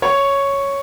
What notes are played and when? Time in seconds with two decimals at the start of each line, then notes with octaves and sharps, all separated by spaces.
0.02 C#5